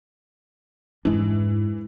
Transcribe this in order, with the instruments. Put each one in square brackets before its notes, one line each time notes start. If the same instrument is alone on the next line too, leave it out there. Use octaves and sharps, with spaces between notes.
[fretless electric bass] F2 G#3 D4 [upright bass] G#2 [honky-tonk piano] E3